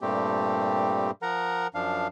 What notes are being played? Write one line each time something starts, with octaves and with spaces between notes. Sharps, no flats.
G2 A#2 G3 A3 C4 G4
F3 A#4 F#5 A#5
F#2 F3 D4 F5